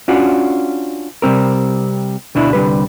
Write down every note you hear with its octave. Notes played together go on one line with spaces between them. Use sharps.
C#4 D4 F4 F#4
C3 G3 C4 A#4
D2 B2 D4 E4
C2 D3 G3 B4